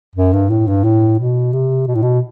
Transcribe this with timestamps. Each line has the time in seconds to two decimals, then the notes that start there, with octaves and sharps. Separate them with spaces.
0.15 F#2
0.33 G2
0.50 A2
0.67 G2
0.84 A2
1.19 B2
1.53 C3
1.87 B2
1.95 A2
2.02 B2